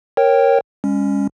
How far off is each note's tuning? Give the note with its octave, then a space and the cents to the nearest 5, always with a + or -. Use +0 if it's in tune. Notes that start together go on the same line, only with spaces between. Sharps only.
A#4 +0 C#5 -15 G5 +0
G#3 -45 C#4 +0